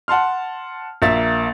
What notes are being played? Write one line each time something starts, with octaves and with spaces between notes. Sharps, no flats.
F#5 A5 C6 F6
A#1 A#3 E5 A6